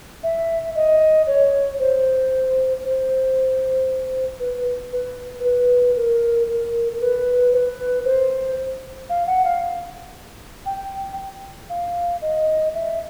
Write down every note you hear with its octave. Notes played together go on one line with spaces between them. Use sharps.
E5
D#5
C#5
C5
C5
B4
B4
B4
A#4
A#4
A#4
B4
C5
B4
C5
F5
F#5
F5
G5
F5
D#5
E5